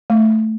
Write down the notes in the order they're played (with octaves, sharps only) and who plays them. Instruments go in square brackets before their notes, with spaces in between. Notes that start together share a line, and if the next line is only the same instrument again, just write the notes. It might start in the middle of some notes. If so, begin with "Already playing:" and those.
[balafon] A3